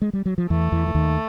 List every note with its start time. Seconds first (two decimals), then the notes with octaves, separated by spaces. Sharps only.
0.02 G#3
0.13 G3
0.26 F#3
0.38 F3
0.50 E2 E3 A3
0.72 E2 E3
0.87 E3
0.95 D#2 D#3